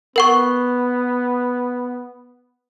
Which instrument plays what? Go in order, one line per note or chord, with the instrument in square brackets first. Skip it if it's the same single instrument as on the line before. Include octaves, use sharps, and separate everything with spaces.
[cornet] B3 [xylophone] A#4 F#5 C#6